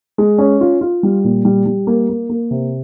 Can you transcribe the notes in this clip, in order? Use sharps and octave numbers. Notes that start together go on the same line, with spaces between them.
G#3
C#4
F4
F4
G3
A#2
G3
G3
A#3
A#3
A#3
C3